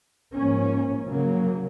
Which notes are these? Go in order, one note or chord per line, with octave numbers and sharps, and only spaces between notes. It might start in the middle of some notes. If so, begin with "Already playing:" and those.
G#2 F3 A#3 C#4
C#3 F#3 A#3